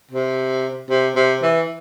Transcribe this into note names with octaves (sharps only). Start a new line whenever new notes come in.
C3
C3
C3
E3